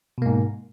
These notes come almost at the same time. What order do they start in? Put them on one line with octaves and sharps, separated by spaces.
B2 A#3 G#2